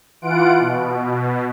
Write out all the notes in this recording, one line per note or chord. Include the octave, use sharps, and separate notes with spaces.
E3 F4 F#5 D7
B2